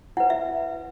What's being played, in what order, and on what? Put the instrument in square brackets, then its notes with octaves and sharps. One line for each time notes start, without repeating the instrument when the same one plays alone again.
[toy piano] E4 B4 F#5
E5